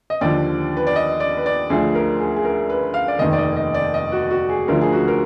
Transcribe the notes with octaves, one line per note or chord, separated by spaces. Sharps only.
D#5
D#2 D3 F3 D5
B4
D5
D#5
D5
B4
D5
D2 D3 F3 G#4
A#4
G#4
G#4
A#4
B4
F5
D5
F1 D#2 D#3 D#5
D5
D#5
D#5
D5
D#5
F#4
F#4
G#4
D2 D3 F3 A#4
G#4
F#4
A#4